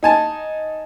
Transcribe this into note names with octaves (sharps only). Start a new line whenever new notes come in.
D#4 G#5 A5